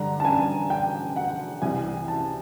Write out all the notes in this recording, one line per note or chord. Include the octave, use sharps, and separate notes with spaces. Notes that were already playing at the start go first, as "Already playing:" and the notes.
Already playing: G2 D3 A#5
A5
G#5
G5
F#5
C2 C3 E3 G#5
A5